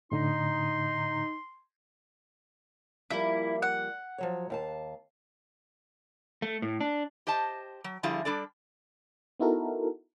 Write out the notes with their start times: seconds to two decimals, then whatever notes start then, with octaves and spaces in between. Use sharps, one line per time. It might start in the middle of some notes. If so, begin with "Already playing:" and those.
0.12 A2 D3 D#4 C6
3.10 F3 G3 A#3 E4
3.62 F#5
4.18 F3 F#3 C#5
4.50 D#2 F5 A5
6.42 A3
6.62 A2
6.81 D4
7.27 G4 C5 D#5 A5
7.84 F#3
8.03 D3 F3 G3 E4 F4 G#4
8.25 G3 D4 A4 D5
9.40 B3 D#4 E4 F#4 A4 A#4